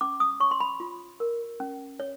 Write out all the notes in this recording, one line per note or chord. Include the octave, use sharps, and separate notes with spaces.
C#4 D6
D#6
C#5 C#6
C6
B5
F4
A#4
C#4
C#5